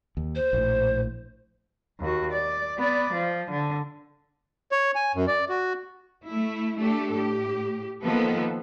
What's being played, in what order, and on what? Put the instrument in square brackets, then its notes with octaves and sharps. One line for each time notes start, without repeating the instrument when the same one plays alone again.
[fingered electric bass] D#2
[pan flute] C5
[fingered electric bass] A#1 A2
[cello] D#2 F#4
D5
B3 D5
F3
D3
[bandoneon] C#5
G#5
F#2
D5
F#4
[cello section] A3 E4
A3 D4 G4 A4
A2 G4
D#3 F3 A#3 B3 A4 B4